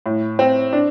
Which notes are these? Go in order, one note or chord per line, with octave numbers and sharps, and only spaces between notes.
A2
C4
D4